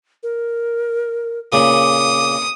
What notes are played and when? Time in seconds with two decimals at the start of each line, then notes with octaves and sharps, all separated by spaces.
0.23 A#4
1.53 A#2 C#3 D6 D#6